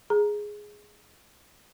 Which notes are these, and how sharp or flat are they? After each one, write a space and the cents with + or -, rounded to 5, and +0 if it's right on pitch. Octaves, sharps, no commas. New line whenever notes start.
G#4 +0 A#5 +0